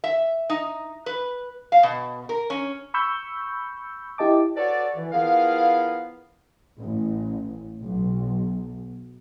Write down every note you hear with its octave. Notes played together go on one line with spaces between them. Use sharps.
E5
D#4
B4
F5
B2
A#4
C#4
B5 C#6 E6 G6
E4 G4 D#5 A5 D6
F#4 A4 B4 C#5 D5
E3
F3 B3 E4 G#4 A#4 F5
A1
B1